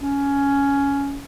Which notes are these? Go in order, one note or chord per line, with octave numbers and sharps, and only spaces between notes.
C#4